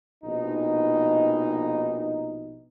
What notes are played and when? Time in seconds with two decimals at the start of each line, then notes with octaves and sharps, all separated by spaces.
0.24 A#1 B2 D#4